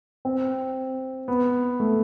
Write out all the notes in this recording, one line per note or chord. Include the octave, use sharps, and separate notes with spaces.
C4
B3
A3